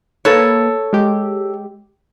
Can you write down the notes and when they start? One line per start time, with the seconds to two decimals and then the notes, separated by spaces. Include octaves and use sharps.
0.25 A#3 A4 B4 C#5
0.93 G#3 G4